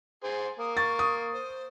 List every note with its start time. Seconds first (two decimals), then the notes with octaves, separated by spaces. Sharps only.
0.24 G#4 C5
0.59 A#3 D#6
0.77 C#6 A6
0.99 D#6
1.33 C5